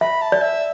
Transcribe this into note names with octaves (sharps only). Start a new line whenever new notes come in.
E5 B5
A5
D5
E5